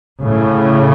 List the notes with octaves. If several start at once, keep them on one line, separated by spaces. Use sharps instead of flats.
A2 C#3